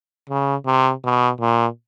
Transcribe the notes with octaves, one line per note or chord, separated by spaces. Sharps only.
C#3
C3
B2
A#2